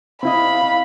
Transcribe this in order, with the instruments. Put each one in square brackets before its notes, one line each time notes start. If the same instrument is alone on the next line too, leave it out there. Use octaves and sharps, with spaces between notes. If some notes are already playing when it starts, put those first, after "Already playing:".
[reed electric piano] C4 E4 D#5 [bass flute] F5 [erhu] B5